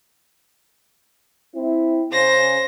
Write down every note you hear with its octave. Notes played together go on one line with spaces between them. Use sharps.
C4 E4
C#3 C5 A#6